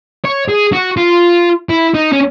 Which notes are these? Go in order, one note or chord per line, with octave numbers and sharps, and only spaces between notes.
C#5
G#4
F#4
F4
E4
D#4
C#4